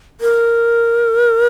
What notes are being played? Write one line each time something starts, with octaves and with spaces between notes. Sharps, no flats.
A#4